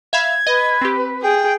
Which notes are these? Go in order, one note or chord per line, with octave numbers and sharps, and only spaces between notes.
E5 F5 B5 G#6
B4 D#5
C4 G4
G#4 G5